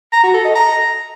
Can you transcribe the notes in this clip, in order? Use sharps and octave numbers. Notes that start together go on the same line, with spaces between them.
A#5
F#4
A4
D#5
A#5